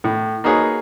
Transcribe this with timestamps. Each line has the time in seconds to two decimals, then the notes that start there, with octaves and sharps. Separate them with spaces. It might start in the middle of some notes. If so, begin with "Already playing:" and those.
0.04 A2
0.44 A#3 D#4 F#4 G#4 B4 C#5